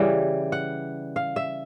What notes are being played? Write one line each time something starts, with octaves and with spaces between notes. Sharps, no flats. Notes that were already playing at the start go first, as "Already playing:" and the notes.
Already playing: C#3 E3 G3
F#5
F5
E5